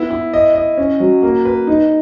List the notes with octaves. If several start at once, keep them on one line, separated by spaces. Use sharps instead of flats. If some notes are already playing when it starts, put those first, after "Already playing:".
Already playing: B3 E4
E4
D#5
D#5
C#4
F#3
A#3
B4
D#4